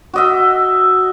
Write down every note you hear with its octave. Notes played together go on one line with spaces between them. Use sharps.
F#4 D#5 E5